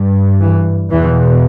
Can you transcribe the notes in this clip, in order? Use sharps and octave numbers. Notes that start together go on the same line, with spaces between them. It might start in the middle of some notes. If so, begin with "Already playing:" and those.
Already playing: G2
E3
E2 B2 E3